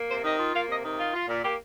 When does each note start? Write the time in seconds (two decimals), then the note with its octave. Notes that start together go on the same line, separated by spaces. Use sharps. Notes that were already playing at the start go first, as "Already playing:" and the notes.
Already playing: A#3
0.09 C3 C5
0.23 D#3 D#5
0.39 F4
0.53 A#3 F5
0.68 C3 D#5
0.84 D#3
0.98 F4
1.14 F4
1.28 A#2
1.43 A#3 G4